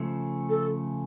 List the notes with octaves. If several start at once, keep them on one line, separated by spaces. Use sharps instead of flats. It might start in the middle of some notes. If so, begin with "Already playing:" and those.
Already playing: C#3 F3 A3
A4